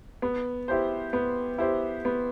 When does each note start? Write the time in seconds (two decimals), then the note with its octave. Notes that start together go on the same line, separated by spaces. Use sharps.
0.22 B3
0.68 E4 G4 C5
1.13 B3
1.58 E4 G4 C5
2.05 B3